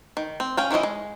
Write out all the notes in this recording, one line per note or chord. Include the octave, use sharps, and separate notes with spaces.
D#3
C4
C#4 F5 G5
D#3 F3 C#4 E4 D#5
G#3